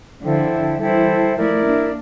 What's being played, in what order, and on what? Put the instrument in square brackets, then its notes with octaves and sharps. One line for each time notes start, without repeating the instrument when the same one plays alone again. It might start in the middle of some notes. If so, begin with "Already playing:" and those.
[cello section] D3 F3 [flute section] E4 A4 C5 G5
[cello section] E3 G3 [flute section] E4 A4 C5 G5
[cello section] F3 A3 [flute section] E4 A#4 D5
[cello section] A#3 D4